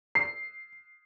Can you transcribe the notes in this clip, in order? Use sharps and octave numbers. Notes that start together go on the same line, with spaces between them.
C7